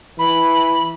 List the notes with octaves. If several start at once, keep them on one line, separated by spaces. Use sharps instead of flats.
E3 B5